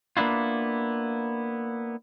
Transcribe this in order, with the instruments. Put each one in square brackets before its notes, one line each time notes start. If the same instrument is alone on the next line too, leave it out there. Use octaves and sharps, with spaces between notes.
[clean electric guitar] A#3 B3 D4 E4 F4